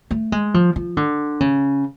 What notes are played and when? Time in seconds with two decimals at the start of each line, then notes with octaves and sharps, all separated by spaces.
0.11 A3
0.32 G#3
0.54 F3
0.76 F3
0.97 D3
1.40 C#3